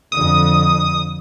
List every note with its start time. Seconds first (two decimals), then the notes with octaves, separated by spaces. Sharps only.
0.12 F2 D3 D#6